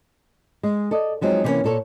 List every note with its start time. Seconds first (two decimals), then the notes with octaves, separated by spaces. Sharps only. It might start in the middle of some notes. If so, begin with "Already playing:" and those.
0.63 G#3
0.91 A4 D5 D#5
1.21 F3 F#3 G#3 C4 D#4
1.44 C3 E3 G3 A#3 C#4
1.64 A#2 A4 C#5